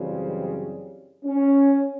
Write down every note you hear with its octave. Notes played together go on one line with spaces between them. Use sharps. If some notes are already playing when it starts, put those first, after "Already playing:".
Already playing: F#2 C#3 E3 G3 C4
C#4